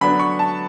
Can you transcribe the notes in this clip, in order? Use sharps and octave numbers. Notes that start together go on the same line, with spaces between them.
D3 F#3 B3 D4 B5
C#6
A5